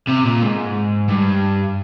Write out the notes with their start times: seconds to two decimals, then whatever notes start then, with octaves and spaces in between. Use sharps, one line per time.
0.08 C3
0.25 A#2
0.42 G#2
1.09 G2